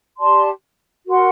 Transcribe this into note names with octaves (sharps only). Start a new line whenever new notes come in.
G4 D5 A5 C6
F#4 A#4 F#5 C6